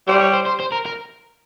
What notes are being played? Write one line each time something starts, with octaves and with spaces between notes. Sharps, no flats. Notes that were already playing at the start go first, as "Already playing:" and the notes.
G3 C5
C#5
C5
C5
C5
A#4
A#4